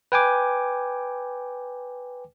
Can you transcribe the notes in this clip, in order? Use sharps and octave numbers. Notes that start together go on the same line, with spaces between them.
B4 G5 G#5 D6